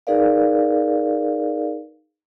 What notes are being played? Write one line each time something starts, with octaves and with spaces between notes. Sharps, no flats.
D#4 G#4 A#4 B4 D5 F5